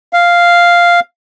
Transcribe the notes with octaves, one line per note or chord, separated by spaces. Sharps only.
F5